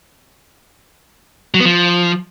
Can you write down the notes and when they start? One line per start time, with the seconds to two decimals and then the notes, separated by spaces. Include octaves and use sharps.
1.54 F#3
1.60 B3
1.65 F3